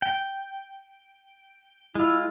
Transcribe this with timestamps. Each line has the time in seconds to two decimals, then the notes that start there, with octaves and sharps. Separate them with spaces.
0.02 G5
1.95 G#3 E4 F4